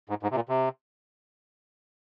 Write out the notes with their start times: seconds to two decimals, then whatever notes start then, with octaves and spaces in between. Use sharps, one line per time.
0.09 G#2
0.23 G#2
0.31 C3
0.35 A#2
0.49 C3